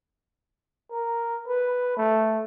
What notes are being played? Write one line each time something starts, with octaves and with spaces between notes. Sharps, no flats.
A#4
B4
A3